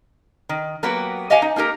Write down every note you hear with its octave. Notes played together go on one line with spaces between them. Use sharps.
D#3
F#3 A#3 B3 F#4 G4 B4
G4 D#5 F5 F#5 G#5
D#4
A#3 D#4 G4 A#4